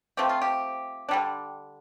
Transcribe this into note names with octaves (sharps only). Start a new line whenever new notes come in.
F3 A3 C4 G4
F4
G4
D3 G3 D4